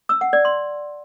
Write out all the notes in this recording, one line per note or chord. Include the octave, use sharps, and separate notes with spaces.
E6
F#5
D5
C6